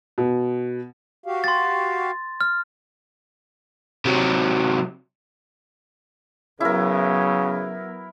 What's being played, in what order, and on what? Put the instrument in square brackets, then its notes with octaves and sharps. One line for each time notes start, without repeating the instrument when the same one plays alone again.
[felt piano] B2
[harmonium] F#4 G4 F5
[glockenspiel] C6 A6
F6
[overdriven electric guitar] C3 F#3
[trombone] C#3 [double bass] F#3 B3 [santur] E4 A#4